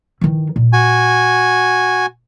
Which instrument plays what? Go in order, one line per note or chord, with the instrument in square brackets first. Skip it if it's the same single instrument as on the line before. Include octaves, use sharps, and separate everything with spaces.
[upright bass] D#3 E3
A#2
[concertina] F#4 G#5